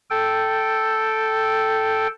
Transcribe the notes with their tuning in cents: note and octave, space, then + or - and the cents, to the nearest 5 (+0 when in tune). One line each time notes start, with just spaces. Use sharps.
A4 +0 G5 -5